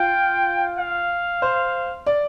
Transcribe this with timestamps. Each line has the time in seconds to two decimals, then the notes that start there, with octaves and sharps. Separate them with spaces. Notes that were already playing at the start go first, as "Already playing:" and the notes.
Already playing: F4 G5
0.79 F5
1.42 C5
2.06 D5